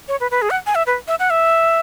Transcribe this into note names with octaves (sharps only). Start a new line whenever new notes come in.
C#5
B4
B4
G#4
F#5
G#5
E5
B4
E5
F#5
E5